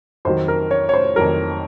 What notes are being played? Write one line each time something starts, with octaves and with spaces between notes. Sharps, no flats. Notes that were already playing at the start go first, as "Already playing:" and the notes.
F2 D#3 F#3 C5
A#4
C#5
C#5
C5
F2 D#3 F#3 A#4